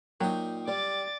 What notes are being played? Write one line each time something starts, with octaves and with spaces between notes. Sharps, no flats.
A#2 F#3 D#4 G5
G3 D5 D6 A6